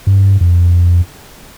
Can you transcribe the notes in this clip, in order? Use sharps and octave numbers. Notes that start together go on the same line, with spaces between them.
G2
F2